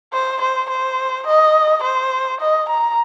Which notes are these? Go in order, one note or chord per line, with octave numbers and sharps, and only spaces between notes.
C5
C5
C5
D#5
C5
D#5
A#5